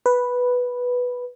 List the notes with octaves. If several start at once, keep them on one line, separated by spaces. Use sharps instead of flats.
B4